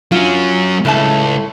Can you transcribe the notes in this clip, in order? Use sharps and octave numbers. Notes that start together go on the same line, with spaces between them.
F#3 C#4 F4
C#2 A2 A3 A5